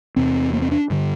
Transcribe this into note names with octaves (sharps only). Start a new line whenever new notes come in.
E2 C3 C4
A#3
C4
D4
G2 D3